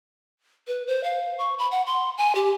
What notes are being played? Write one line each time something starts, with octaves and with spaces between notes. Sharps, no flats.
B4
C5
F5
C#6
B5
F#5
C6
G#5
G4